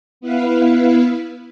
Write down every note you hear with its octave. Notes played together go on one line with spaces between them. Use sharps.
B3 E4 B4 F5